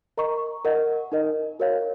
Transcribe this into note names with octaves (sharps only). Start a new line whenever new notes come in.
A#4 D#5 A#5 C#6
A#4 D#5 F#5
D#4 A#4 D#5
F#4 A#4 C#5 F5